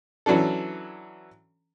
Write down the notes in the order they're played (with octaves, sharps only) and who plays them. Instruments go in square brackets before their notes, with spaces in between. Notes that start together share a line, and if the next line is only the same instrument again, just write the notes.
[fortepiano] E3 F#3 C#4 D4 A4